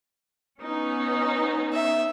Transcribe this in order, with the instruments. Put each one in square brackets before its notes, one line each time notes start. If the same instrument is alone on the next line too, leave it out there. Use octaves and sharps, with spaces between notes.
[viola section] B3 C#4 D#4
[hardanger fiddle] E5